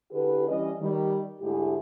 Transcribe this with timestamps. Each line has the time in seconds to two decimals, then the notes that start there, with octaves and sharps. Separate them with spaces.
0.11 D3 E4 G4 G#4 B4
0.47 E3 G3 C#4 C#5 D#5
0.80 D#3 G3
1.39 D2 G#2 E4 G4 G#4